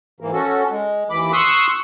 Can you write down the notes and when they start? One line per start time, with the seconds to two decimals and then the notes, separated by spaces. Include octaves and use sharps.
0.20 G#2 E3 A#3
0.33 C#4 F#4 A4
0.70 G#3
1.10 D#2 E3 B5 D6
1.33 C6 C#6 D#6 E6 F#6